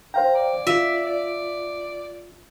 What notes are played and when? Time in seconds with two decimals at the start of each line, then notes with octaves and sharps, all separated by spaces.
0.14 C5 F5 G5 A#5
0.35 D5
0.67 F4 E5
1.06 D5